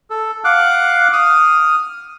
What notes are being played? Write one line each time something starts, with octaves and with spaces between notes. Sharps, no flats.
A4
F5 F#5 D6 F#6
D#6 F6